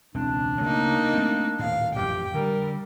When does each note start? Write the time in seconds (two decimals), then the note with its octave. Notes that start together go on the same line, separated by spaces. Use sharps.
0.14 E1 C#2 C4 D4
0.61 D2 C#3 A3 A#3 D#4
1.14 A3 C4
1.59 D#1 A2 F5
1.96 A1 F2 G4 G5
2.34 D3 G3 A#4